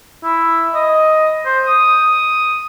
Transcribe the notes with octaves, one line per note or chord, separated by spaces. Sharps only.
E4
D#5
C5
D#6